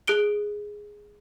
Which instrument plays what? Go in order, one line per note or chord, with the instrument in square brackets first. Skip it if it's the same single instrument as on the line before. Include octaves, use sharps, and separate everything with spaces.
[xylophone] G#4 F#6 D7 G7